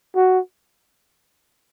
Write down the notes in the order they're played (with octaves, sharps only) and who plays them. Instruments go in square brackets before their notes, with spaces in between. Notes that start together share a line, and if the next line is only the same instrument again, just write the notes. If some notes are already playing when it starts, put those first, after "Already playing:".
[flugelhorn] F#4